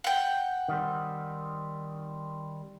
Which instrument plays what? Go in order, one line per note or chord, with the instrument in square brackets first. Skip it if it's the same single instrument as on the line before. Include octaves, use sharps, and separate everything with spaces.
[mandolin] F#5 G5
[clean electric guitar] D#3 G3 C4